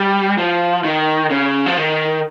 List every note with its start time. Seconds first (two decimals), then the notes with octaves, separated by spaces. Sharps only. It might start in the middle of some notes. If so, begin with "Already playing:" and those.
Already playing: G3
0.38 F3
0.84 D#3
1.30 C#3
1.66 F3
1.77 D#3